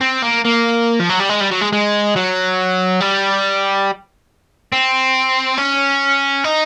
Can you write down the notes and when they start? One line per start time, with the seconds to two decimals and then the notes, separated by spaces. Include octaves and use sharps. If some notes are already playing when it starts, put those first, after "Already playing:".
0.01 C4
0.22 A#3
0.45 A#3
0.99 F3
1.09 F#3
1.19 G3
1.29 G#3
1.41 G3
1.51 F#3
1.61 G#3
1.73 G#3
2.16 F#3
3.00 G3
4.73 C4
5.58 C#4
6.44 D#4